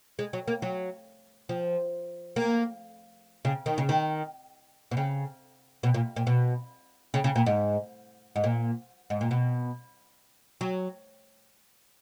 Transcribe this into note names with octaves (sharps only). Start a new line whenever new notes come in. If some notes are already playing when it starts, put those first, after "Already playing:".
G#3
F#3
A#3
F#3
F3
A#3
C#3
D#3
C#3
D#3
B2
C#3
B2
A#2
A#2
B2
C#3
C#3
A#2
G#2
G#2
A#2
G#2
A#2
B2
F#3